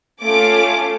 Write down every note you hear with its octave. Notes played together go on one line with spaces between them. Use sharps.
A3 C#4 F4 D6